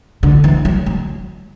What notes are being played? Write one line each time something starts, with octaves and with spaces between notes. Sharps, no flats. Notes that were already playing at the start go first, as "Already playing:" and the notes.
D3
E3
F#3
F#3